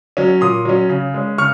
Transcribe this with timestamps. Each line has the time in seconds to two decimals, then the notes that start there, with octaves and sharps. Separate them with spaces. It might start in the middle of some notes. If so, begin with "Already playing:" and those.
0.17 F#3 C#4
0.41 A#2 C6 D#6
0.65 F#3 C#4
0.89 C#3
1.14 G#3 C#4
1.38 C#3 C#6 F6